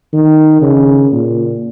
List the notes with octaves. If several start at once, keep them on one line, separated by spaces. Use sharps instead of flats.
D#3
C#3
A#2